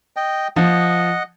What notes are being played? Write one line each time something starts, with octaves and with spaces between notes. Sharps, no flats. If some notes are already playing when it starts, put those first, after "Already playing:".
D#5 G5
F3 D#5 F#5